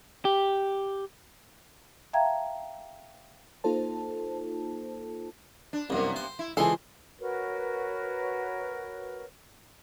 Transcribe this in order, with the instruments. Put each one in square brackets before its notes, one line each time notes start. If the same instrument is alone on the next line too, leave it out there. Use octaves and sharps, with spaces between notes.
[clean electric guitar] G4
[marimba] E5 F5 G5 A5 A#5 G#6
[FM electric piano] A#3 D#4 F4 A4 C5 A5
[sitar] D4
[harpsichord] C2 F#2 [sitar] C3 A#3 B3
[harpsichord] C5
[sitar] E4
[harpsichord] C#2 E3 C6 [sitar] C3 [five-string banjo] G#4 A4
[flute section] F#4 A#4 B4 C#5